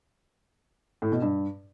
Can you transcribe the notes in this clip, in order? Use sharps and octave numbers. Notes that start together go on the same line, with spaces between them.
A2
B2
G2